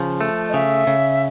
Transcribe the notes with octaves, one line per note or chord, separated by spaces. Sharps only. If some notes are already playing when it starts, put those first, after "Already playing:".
Already playing: C#3 F3
A3
D#5
C#3 E5
C#3